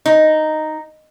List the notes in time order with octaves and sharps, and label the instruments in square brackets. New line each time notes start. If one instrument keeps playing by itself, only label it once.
[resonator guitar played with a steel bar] D#4